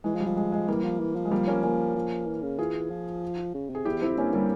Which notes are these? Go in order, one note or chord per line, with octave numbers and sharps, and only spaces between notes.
E3 G#3
F3
G3
F3
G#3
G#3
E3 G3 A#3
F3
E3
F3
G#3
G3 A#3
A#3 C#4
A#3 C#4
F3
E3
C#3
E3 F4 G#4
F3
C#3
C3
G#4
E2 E4 G4
F2 C4 E4
G2 A#3 C#4
G3 A#3